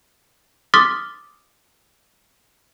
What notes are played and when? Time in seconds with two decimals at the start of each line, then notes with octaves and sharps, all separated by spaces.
0.74 C6 D6 D#6 F6 A6 B6